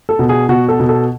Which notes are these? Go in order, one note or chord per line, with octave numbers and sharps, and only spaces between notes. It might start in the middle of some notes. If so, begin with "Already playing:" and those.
A4
B2
G#4
B2 F#4
A4
B2
A4